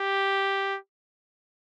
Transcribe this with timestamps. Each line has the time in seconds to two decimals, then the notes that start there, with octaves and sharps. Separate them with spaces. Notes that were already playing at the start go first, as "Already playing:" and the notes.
Already playing: G4